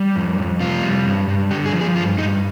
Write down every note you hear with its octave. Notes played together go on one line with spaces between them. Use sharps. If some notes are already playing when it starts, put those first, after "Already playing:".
Already playing: G3
F2
F2
C3 F4
G3
G2
G2
D3 G4
G#4
F3
G#4
G2 F4
G2 D#4